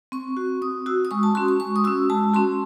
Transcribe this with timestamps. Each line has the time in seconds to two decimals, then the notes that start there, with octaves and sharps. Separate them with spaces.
0.12 C4 C#6
0.37 F#4
0.62 C4 D#6
0.86 F#4 E6
1.05 D#6
1.11 G#3 C#6
1.23 A5
1.35 C#4 F#4 C6
1.48 C#6
1.60 G#3 C#6
1.76 D#6
1.84 C#4 F#4 E6
2.09 G#3 A5
2.34 C#4 F#4 C6